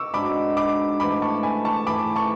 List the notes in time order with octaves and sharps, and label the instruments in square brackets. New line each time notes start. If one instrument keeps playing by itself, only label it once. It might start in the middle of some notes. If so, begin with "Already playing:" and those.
Already playing: [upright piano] C#6 D6 E6
[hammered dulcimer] G#2 G#3 D4 F#4 [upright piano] B5 D6
[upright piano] B5 D6
[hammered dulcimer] G#2 E3 A3 [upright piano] B5 D6
[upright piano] A5 C#6
G#5 B5
A5 C#6
[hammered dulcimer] G#2 E3 A3 [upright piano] B5 D6
[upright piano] A5 C#6